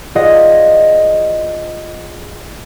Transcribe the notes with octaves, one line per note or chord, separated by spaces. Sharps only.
F4 G#4 C5 D5 D#5 F#5